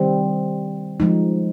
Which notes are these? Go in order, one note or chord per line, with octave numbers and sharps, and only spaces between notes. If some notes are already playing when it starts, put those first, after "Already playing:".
Already playing: D#3 G3 C4
F3 G#3 D#4